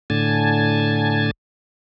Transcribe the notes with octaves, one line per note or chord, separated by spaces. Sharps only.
A2 D3 G#5 A5